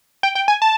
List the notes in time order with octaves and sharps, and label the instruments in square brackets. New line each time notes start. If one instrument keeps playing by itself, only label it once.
[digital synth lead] G5
G5
G#5
A5